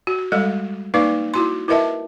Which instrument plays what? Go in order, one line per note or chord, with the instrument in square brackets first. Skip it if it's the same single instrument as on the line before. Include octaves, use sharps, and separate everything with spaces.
[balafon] F#4
G3 G#3 A4 D#5
A#3 D#4 B4 D5 F5 D6
E4 F#4 C6
E4 A#4 B4 D#5 E5 A5